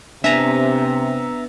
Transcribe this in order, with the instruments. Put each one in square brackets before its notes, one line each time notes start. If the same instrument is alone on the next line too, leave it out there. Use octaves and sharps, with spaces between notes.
[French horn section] C3 [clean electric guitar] B3 D4 G#5 [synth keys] E5 A#5